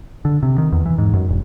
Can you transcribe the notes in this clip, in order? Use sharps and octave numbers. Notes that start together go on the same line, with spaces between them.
D3
C3
D#3
E2
E3
G#2
F#2
E1